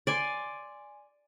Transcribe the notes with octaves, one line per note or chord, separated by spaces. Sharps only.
D5 G#5 C6